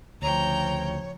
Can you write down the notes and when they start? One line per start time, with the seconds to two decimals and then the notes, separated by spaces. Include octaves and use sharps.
0.22 D2 C#3 F3 C#5 G5 A#5